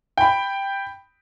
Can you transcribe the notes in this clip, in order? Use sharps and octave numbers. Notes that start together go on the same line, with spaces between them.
G5 B5